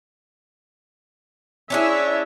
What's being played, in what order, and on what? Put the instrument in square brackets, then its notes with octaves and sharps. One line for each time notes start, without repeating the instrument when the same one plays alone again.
[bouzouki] C#4 D4 G#4 [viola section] E4 C#5 E5